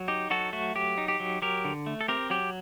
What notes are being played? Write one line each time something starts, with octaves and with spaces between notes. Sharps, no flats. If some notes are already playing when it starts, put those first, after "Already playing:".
Already playing: F#3
D#4 G4
F#3 F#4 A4
A3 F#4
F#3 G4
D#4
G4
F#3
F#3 G4 A#4
D3
A3
A4
C4 G4 A#4
F#3 G4